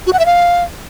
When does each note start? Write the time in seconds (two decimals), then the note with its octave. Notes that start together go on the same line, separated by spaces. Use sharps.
0.07 F#4
0.13 F#5
0.19 E5
0.26 F5